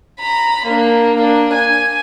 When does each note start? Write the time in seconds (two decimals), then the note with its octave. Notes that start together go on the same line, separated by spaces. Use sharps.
0.20 A#5 B5
0.65 A#3 D4
1.16 A#3 D4
1.53 G#5